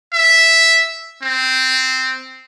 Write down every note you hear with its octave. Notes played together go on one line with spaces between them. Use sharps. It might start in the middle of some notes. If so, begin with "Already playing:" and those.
E5
C4